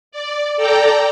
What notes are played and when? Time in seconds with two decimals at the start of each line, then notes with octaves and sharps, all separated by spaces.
0.12 D5
0.56 A4 D5 G5 A#5